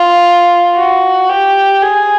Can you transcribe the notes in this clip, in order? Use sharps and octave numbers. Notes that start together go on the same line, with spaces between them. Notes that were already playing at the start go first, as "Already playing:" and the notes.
Already playing: F4
F#4
G4
G#4